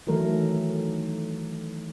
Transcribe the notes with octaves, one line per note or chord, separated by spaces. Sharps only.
D#3 E3 F#3 A3 A#4